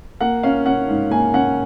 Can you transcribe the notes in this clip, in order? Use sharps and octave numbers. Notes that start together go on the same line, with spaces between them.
A#3 F#5
C#4 F5
C#4 F#5
G#2
A#3 G#5
C#4 F#5